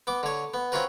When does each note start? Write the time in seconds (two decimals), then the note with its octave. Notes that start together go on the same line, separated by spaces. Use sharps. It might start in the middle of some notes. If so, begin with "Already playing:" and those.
0.07 B3 D6
0.23 D3 C#5
0.54 B3
0.72 C4 C#4 F4 F#4 A#4 B4